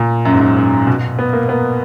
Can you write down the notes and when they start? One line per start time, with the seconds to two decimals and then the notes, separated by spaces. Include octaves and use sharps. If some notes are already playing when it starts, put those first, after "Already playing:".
Already playing: A#2
0.25 F#2
0.33 G#2
0.40 F#2
0.57 F#2
0.87 B2
1.19 B3
1.33 A#3
1.49 B3